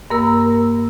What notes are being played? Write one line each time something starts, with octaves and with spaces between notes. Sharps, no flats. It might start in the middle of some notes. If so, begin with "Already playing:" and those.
G2 A#3 A#4 E6